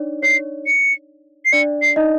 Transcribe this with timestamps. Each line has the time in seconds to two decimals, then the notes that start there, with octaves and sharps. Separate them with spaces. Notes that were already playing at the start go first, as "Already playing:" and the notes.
Already playing: D4 D#4 C#5 D5
0.23 C#5 C7
0.67 C#7
1.45 C7
1.53 D4 D5 C#7
1.82 C7
1.96 D#4 D#5